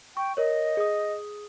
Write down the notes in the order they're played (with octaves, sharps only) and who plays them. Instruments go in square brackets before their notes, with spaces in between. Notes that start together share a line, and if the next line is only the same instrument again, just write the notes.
[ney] G5 [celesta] C#6
[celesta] A#4 C#5 [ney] D#5
[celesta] G#4 D#6